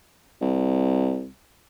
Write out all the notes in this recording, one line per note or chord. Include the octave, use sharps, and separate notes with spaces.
C2